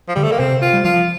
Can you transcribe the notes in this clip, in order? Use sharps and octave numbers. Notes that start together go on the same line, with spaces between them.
F3
D3 G3
A3
A#3
C3 C4
F4
G3
F3 F4